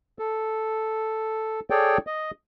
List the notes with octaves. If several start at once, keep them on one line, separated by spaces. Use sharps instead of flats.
A4
G#4 A4 C#5 D5 G5
D#5